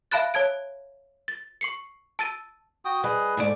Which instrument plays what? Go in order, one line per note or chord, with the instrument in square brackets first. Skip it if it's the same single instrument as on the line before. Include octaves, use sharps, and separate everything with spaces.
[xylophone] E5 F5 A5 B5 F#6 A6
C#5 A5 G#6 D7
A6
C#6 C7 C#7
A5 E6 A6 D#7
[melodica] F#4 G5 D#6
[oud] G3 [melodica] G#4 B4 D#5
[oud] G#2 A3 D5